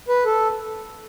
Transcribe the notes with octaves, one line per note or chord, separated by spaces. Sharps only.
B4
A4